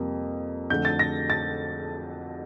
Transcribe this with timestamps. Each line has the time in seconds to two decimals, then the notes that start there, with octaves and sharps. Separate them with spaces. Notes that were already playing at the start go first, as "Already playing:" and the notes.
Already playing: F2 C3 G3 A#3
0.70 F2 D3 A3 G6
0.85 A6
0.99 A#6
1.30 A6